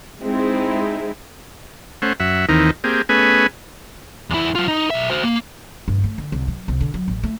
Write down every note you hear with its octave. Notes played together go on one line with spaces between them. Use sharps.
G#3 C4 D#4 E4 G#4
A3 C#4 C5 F#5
F#2 E5 F#5
D#2 D#3 E3 A#3 C4 D#4
A#3 C4 G4 G#4
A3 B3 C#4 G#4 B4 G#5
E2 E4
F#3 F4
D#4
B1 E5
F#4 C5
A#3
G2
A3
D3
C2
F#3
C2
D3
F#3
A1
A3